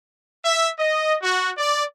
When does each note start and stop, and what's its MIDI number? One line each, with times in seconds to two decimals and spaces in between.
0.45 0.68 76
0.78 1.15 75
1.22 1.50 66
1.57 1.83 74